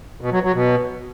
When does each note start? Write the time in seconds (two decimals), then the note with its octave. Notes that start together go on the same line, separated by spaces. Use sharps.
0.21 B2
0.32 F#3
0.43 F#3
0.54 B2